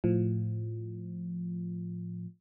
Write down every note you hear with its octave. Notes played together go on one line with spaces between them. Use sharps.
A2 F3